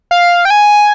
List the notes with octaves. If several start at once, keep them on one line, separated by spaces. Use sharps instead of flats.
F5
G5
G#5